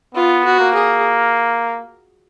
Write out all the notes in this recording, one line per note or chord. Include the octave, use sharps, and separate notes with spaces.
B3 F4
F#4
A#3
G#4